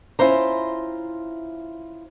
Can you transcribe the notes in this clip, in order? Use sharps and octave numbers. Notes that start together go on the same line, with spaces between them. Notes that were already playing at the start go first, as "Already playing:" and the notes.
C#4 E4 F4 C5 A#5